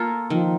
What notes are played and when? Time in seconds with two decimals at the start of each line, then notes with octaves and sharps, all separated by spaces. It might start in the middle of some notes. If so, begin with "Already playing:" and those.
Already playing: A#3 F4 A4
0.30 D#3 F3